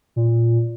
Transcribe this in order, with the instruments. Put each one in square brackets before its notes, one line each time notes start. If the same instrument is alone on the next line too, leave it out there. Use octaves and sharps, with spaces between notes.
[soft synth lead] A#2